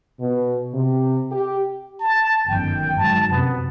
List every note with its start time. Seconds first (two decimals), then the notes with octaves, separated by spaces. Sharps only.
0.20 B2
0.74 C3
1.32 G4
2.00 A5
2.48 G1 F#2 D#3 G5
2.98 G#2 F#3 A5
3.31 F#2 C3 B3